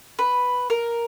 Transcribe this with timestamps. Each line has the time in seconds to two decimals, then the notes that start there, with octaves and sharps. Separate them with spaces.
0.19 B4
0.70 A#4